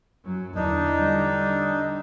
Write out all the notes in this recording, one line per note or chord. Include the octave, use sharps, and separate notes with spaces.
F#2 F#3
E2 D3 D4 D#4
D3 G3